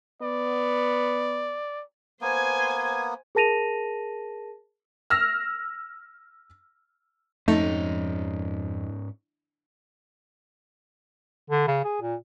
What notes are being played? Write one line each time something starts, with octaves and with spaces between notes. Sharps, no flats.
B3 D5
A#3 B3 C5 G#5 G#6
G#4 A#4 A5 A#6 D#7 F7
E6 F6 A#6
F2 G#2 A3 C#4 D#4
D3
C#3
G#4
A#2